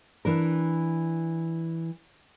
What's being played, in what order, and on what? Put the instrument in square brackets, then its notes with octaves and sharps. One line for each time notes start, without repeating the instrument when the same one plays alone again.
[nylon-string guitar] E3 D4 A#4